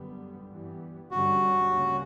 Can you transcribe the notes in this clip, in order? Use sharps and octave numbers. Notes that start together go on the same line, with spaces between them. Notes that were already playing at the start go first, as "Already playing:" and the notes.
Already playing: F#2 D3 G3 B3
G2 E3 G3 B3
G2 D3 G3 C#4 F#4
D2 C#3 G3 A#3 C#4